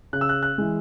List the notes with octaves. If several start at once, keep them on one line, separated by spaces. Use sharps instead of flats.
C#3 F#6
E6
F#6
F#6
E3 G#3